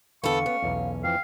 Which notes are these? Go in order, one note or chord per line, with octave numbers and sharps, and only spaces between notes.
E2 D3 B3 A4 F5 G5 C#6
B3 C#4
B1 E2
F2 E3 F5 G5